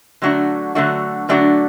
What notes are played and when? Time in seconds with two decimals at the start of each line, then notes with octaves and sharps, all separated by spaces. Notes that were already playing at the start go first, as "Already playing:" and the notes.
0.22 D3 F#3 A3 D4 F#4
0.75 D3 F#3 A3 D4 F#4
1.29 D3 F#3 A3 D4 F#4